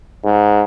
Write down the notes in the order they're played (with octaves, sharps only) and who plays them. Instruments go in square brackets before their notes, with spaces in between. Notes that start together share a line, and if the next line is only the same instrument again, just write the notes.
[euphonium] G#2